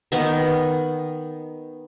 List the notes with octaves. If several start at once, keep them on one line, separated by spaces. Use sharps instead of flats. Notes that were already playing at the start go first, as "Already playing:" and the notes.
D#3 B3